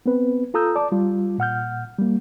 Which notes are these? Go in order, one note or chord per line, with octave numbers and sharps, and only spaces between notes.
B3 C4 B4
F4 A4 A#5 D#6 E6 G6
D5 A5 D6
G3 F4
A#2 F#5 F6 G6
G3 A#3